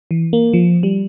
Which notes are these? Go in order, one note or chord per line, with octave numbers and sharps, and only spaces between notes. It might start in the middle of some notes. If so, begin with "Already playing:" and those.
E3
A#3
F3
G3